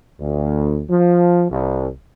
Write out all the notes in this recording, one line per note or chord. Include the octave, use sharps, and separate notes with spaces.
D2
F3
C2